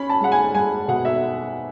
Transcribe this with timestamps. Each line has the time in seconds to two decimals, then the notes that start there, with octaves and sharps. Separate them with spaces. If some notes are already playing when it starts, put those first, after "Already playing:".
Already playing: C#4 B5
0.09 A5
0.21 G#3 F#5
0.32 G#5
0.54 G#3 G#5
0.88 B2 F#5
1.05 E5